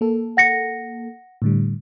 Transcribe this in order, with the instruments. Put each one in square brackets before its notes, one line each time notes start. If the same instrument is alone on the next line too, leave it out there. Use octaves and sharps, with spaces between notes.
[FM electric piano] A#3 A4
[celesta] F#5 A#6 C#7
[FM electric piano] A2 D3 G3